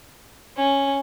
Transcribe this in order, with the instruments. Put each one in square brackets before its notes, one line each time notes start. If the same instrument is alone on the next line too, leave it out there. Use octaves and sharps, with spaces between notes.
[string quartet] C#4